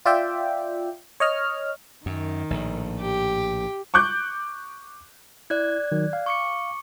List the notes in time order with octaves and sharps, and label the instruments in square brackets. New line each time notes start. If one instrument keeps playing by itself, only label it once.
[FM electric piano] F4 D5 E5 G5
C#5 D#5 F6
[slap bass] F#2 [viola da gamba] D#3
[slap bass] A#1 A2
[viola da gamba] G4
[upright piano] C#6 D6 F#6 G6
[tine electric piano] E4 [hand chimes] D5 F#6 G#6
[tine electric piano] D#3 F#3
F5
[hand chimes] C#6 D6 C#7